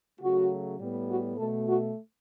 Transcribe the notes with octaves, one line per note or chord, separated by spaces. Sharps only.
C#3 F#3 A3 F#4
A2 G3 B3
F#4
B2 A3 A4
F#4